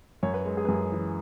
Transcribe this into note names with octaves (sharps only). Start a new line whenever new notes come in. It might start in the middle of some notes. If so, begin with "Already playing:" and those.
F#2 C#5
B4
G#3
G#4
B4
F#2 G#4
E3